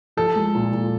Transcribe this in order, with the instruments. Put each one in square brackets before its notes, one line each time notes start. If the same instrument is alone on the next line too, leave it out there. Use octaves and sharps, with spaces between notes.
[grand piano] F3 [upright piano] A4
[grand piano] G#3
A#2
A#2